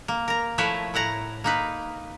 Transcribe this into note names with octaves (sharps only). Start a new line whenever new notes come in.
A#3
A#4 A#5
F3 A3 E4 B4 C#5 E5
A2 E4 F#5 A#5
A#3 D#4 B4